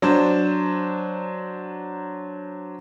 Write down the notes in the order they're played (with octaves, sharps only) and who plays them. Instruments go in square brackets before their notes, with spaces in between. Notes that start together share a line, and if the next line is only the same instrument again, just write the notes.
[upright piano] F#3 D4 C5